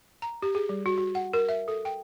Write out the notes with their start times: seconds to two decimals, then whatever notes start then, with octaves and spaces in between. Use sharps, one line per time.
0.22 A#5
0.42 G4
0.55 G#4
0.69 G3
0.86 F#4
0.98 F#4
1.15 F#5
1.33 A#4
1.49 E5
1.68 A4
1.85 G5